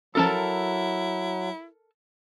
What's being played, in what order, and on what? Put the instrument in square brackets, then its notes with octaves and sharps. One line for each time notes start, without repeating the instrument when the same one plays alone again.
[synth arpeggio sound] F3 C#4 F#4 [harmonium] F#3 [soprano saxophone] E4 [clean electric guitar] A4 A#4 A5